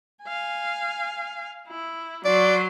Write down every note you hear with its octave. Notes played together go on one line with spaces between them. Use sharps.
F5 G#5
E4
F#3 D5 C6